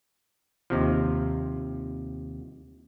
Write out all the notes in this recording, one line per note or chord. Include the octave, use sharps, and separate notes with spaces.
D#2 C3 F3